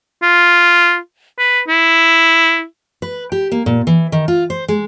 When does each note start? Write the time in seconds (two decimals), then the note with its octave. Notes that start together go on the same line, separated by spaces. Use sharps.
0.23 F4
1.38 B4
1.68 E4
3.02 B4
3.32 G4
3.52 A#3
3.66 A#2
3.87 E3
4.12 D#3
4.28 F4
4.50 C5
4.68 G#3